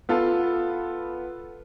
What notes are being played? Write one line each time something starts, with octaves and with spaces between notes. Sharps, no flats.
B3 F4 A4